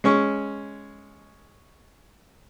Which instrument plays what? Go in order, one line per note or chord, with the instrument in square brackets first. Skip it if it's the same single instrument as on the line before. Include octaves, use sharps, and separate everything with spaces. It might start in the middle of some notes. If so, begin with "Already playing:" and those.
[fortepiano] G#3 C#4 C#6